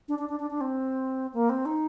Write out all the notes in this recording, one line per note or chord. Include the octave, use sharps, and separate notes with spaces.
D4
D4
D4
D4
D4
C4
A#3
C4
D#4